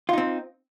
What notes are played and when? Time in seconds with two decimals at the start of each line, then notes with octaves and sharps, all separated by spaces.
0.09 F4
0.13 D#4
0.18 C4